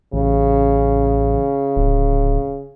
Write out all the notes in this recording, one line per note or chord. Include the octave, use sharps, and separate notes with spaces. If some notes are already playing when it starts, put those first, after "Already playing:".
A1 C#3
D1